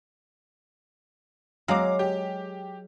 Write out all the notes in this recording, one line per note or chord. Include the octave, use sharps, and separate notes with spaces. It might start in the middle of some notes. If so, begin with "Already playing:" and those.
F#3 G#3 F5 A#5 D6
G4